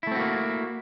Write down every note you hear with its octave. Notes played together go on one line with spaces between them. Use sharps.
A3 A#3 C4 E4 F#4